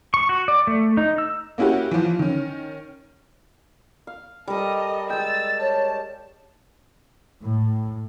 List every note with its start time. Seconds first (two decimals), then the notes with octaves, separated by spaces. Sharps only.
0.14 C#6
0.29 F#4
0.48 D5
0.67 A3
0.97 D#4
1.18 E6
1.58 A#3 C#4 E4 F#4 G4
1.91 E3 F3
2.19 D#3 C#4
4.07 F5
4.48 G3 A4 A#4 D#5
5.10 G#3 G5 E6 A6
5.60 C#5 A5
7.44 A2